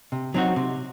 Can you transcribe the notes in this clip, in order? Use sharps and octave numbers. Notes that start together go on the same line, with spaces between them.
C3
F#3 C4 D#4 F#4
C3